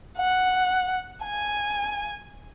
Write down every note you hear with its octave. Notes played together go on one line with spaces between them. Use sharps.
F#5
G#5